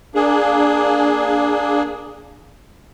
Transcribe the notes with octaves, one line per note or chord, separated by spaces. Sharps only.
A#3 D4 G#4